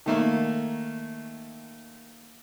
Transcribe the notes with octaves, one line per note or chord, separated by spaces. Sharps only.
D#3 A3 A#3